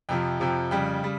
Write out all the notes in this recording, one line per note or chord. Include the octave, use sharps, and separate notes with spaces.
F2 C3 F3 G5
F2 C3 F3
F2 C#3 G3 G5
C#3 G3